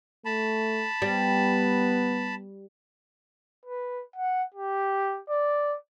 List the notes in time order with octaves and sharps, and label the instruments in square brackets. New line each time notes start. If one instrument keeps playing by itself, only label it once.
[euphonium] A3 [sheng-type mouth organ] A5 B5
[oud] G3 [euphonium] B3
[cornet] B4
F#5
G4
D5